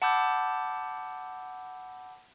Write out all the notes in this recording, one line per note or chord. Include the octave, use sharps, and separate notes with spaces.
F#5 A5 B5 D6 E6 G6